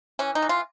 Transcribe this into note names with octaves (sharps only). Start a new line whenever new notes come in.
E3 C#4
D#4
E3
F4